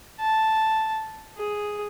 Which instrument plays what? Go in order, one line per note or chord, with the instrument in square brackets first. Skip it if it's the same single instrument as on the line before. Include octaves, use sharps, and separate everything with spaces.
[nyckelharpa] A5
G#4